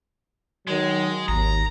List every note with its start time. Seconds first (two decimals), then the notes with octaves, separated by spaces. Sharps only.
0.67 D#3 F#3 G#3
1.28 G#1 D#2 A#5